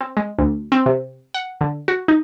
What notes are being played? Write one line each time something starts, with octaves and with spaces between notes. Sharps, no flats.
C4
G#3
D2
C4
C3
F#5
D3
F#4
D#4